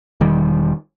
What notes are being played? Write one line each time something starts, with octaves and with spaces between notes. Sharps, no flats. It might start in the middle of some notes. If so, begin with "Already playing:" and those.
E1 D#3 G3